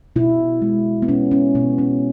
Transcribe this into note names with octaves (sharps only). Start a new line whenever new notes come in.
B2 E4
G#3
B3
B2 C#4
C#4
B2 B3
C#4